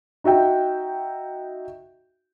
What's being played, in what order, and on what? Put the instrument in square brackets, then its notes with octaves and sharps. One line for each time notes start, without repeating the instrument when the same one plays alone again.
[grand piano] D#4 F#4 E5 G5